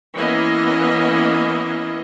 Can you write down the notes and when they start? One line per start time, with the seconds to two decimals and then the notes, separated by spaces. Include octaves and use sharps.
0.15 E3 A#3 B3 C#4 D#5